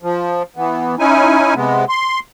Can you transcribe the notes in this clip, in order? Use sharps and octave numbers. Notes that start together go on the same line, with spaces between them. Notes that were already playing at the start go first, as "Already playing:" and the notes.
F3
E3 B3
C#4 D#4 E4 G#5
C3 G#3 B3
C6